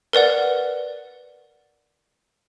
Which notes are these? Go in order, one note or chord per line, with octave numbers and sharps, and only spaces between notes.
A#4 B4 D5 F#5